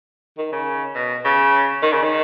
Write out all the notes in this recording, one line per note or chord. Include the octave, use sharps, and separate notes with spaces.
D#3
C#3
B2
C#3
D#3
C#3
D#3